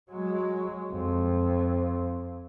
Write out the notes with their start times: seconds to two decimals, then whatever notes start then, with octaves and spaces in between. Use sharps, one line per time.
0.11 F#3 G#3
0.93 F2